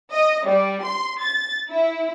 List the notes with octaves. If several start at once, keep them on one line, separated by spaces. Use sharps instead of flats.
D#5
G3
C6
A6
E4